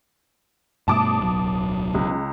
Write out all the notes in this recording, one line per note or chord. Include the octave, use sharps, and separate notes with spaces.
G2 B2 A3 A5 D6 D#6
D1 B1 F#3
C#2